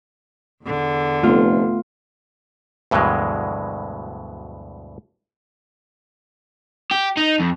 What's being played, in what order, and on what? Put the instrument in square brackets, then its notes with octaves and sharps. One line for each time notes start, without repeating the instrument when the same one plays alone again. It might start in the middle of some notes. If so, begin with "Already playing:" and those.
[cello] E2 D3
[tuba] F1 [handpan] A3 B3 [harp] F4
[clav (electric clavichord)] D2 G2 B2 E3 F#3 G#3
[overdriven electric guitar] G4
D#4
F2